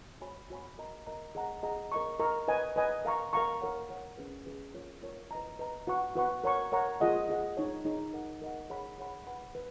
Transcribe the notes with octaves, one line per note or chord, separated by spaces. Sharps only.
F#4 C#5 G#5 B5
F#4 C#5 G#5 B5
A#4 D#5 A#5
A#4 D#5 A#5
G#4 D#5 F#5 A#5
G#4 D#5 F#5 A#5
A#4 D#5 A#5 C#6
A#4 D#5 A#5 C#6
B4 D#5 G#5
B4 D#5 G#5
A#4 F5 A#5 C#6
A#4 F5 A#5 C#6
A#4 C#5 F#5
A#4 C#5 F#5
C#4 G#4 B4
C#4 G#4 B4
F4 A#4 C#5
F4 A#4 C#5
B4 D#5 A#5
B4 D#5 A#5
F#4 B4 F#5 C#6
F#4 B4 F#5 C#6
A#4 C#5 F#5 A#5 C#6
A#4 C#5 F#5 A#5 C#6
F4 G#4 D#5 F#5
F4 G#4 D#5 F#5
D#4 G#4 C#5
D#4 G#4 C#5
A#4 D#5 F#5
A#4 D#5 F#5
G#4 C#5 F#5 B5
G#4 C#5 F#5 B5
B4 F#5 B5
B4